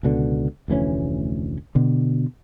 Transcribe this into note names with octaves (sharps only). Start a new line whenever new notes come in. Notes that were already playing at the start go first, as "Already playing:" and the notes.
C#2 B2 D3
F1 D2 E3 C#4
B2 D3